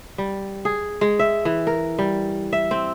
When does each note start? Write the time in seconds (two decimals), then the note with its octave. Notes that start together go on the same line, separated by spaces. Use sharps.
0.18 G3
0.65 G#4
1.01 G#3
1.19 E5
1.45 E3
1.67 A#4
1.99 G3
2.53 E5
2.71 C4